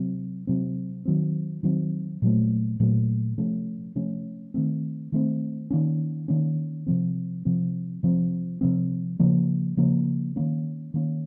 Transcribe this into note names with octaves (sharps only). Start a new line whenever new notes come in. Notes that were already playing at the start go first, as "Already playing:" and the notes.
Already playing: C3 F#3 C4
C3 F#3 C4
D#3 F#3 C4
D#3 F#3 C4
A#2 F#3 A3
A#2 F#3 A3
C3 F3 A3 C#4
C3 F3 A3 C#4
D#3 A3 C4
D#3 A3 C4
D#3 A#3 C#4
D#3 A#3 C#4
C3 F3 C4
C3 F3 C4
C3 F3 C4
C3 F3 C4
C#3 F3 A#3
C#3 F3 A#3
D#3 A#3 C#4
D#3 A#3 C#4